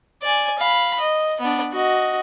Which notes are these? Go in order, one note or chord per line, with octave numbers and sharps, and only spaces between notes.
D5 G#5
F5 B5
D#5
B3 D4
F#4 D#5